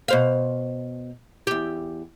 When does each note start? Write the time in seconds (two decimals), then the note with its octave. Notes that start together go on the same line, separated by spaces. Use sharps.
0.08 B2 C5 F5
1.47 E2 G4